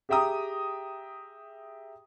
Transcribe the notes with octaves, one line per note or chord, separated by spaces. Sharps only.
G4 G#4 E5 G5 A#5 D#6